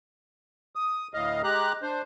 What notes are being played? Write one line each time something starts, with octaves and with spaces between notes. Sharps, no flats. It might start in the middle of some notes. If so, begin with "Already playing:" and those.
D#6
D2 A2 D#5 F5
G#3 G4 A#5 F#6
D4 C5